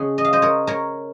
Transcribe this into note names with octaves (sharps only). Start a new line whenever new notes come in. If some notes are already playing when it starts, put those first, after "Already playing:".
Already playing: C#3 G#3 C#4 C#5
D#5
F5
C5 D#5
A#4 C#5
A#4 C#5